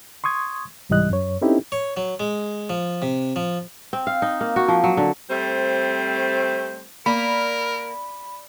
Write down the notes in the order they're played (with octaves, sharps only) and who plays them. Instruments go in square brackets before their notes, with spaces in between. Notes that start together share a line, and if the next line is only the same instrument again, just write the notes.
[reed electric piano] C6 C#6 D#6 G#6
C2 G#2 E3 G3 D#5 F#6
F#2 C#5
C4 C#4 D#4 E4 G4 A4
[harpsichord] C#5
F#3
G#3
F3
C3
F3
[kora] C4
F5
D#4
A#3
F#4
F3
F#3
D3
[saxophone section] G3 A3 C4 C5
[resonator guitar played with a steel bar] A#3 [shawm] A#4 [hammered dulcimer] D5 [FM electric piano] B5